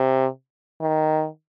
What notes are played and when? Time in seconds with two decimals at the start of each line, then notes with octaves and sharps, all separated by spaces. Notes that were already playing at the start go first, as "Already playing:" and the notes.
Already playing: C3
0.81 D#3